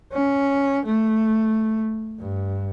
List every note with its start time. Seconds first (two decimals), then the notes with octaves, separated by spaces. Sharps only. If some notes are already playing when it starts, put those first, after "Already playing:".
0.13 C#4
0.86 A3
2.19 G2